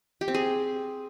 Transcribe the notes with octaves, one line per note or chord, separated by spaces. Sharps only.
G4
C4
G#4